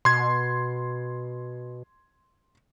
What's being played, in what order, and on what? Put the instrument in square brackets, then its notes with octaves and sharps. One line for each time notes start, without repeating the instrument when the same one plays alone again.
[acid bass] B2 [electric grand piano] C6 G#6